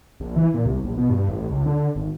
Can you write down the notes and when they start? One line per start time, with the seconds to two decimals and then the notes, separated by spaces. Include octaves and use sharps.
0.20 A#1
0.36 E3
0.54 A#2
0.66 C2
0.84 A#1
0.97 B2
1.09 G2
1.29 A1
1.50 C#2
1.66 D3
1.95 G#1